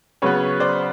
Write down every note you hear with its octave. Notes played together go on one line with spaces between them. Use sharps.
C#3 F#3 B3 B4 C#5
C5 D5